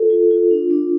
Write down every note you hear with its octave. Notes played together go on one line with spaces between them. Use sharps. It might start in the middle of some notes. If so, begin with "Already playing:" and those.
Already playing: F4 A4
F4
F4
D4
D4